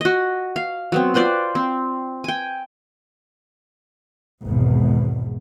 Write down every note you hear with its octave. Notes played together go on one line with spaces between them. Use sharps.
F#4 D#5
F5
F#3 B3 C4
F4 B4 C5 D5
C4
G5 G#5
G#1 E2 B2